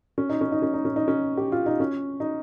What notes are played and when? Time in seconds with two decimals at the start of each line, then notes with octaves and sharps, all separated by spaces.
0.18 C#4
0.30 D#4
0.41 C#4
0.52 D#4
0.62 C#4
0.74 D#4
0.85 C#4
0.96 D#4
1.08 C#4
1.37 G4
1.52 F4
1.66 D#4
1.80 C#4
2.20 D#4